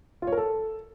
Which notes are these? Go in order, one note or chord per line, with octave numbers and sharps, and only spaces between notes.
F4
C#5
A#4
A4